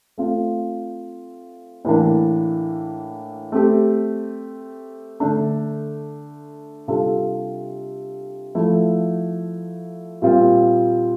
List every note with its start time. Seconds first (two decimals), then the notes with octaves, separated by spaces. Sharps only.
0.18 A3 C4 F4
1.85 A2 E3 A#3 D4
3.52 A3 C4 G4
5.20 D3 A3 D4
6.88 C3 G3 D4 F4 A4
8.55 F3 A3 E4
10.22 A#2 G3 C4 F4